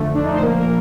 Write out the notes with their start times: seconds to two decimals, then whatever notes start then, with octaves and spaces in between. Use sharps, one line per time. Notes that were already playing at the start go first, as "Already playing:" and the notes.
Already playing: F2 D3 A3
0.14 D4
0.23 D#4
0.33 C5
0.42 A#2 F3 A#3 A#4
0.56 A#4